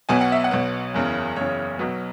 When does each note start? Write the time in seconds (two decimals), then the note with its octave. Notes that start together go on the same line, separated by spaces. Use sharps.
0.09 B1 B2 B3 G#5
0.21 F#5
0.32 E5
0.44 F#5
0.51 B1 B2 B3
0.94 F#1 E2 C#3
1.36 F#1 E2 C#3 C#5
1.79 B1 B2 F#3 B3